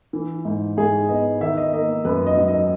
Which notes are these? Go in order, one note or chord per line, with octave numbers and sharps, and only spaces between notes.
E3
G#2
G#2 G#4
B3 D#5
D#3 E5
D#5
A#3 D#5
F#2 B4
D#5
F#3
D#5